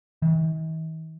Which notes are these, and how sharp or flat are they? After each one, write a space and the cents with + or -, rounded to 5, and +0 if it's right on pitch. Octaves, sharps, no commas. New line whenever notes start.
D#3 +45